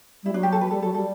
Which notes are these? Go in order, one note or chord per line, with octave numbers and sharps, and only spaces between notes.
G3 E4
F#3 D4
G4
A4
B4
F#3
G3 A4
F#3 A4
G3 A4